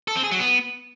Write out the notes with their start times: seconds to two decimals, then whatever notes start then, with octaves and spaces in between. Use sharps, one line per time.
0.08 A4
0.16 C4
0.23 G#4
0.31 F#3
0.39 B3